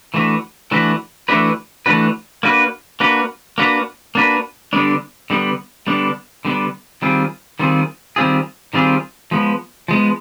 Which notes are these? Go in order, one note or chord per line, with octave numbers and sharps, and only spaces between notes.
E3 A3 D4 F#4 B4
E3 A3 D4 F#4 B4
E3 A3 D4 F#4 B4
E3 A3 D4 F#4 B4
A#3 D4 F#4 B4
A#3 D4 F#4 B4
A#3 D4 F#4 B4
A#3 D4 F#4 B4
D3 G3 B3 D4
D3 G3 B3 D4
D3 G3 B3 D4
D3 G3 B3 D4
D#3 G3 C4 F4 G#4
D#3 G3 C4 F4 G#4
D#3 G3 C4 F4 G#4
D#3 G3 C4 F4 G#4
F3 G#3 B3
F3 G#3 B3